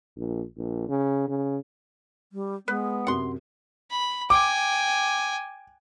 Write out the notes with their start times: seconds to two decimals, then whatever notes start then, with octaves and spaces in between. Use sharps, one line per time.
0.17 A#1
0.58 A#1
0.89 C#3
1.28 C#3
2.33 G3
2.68 G#3 B3 B4
3.07 F#2 C3 F#5 C6
3.91 B5
4.30 G5 G#5 D6